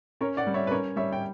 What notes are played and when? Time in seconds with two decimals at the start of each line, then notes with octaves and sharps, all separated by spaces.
0.21 C#4 A#4 C#5
0.37 D5 F#5
0.47 G3
0.54 C#5 E5
0.67 B4
0.71 C#4 A#4 C#5
0.96 G3 C#5 E5
1.13 G5